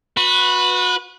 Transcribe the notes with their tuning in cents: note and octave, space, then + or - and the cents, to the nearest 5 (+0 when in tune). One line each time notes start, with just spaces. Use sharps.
F#4 -30 B4 +0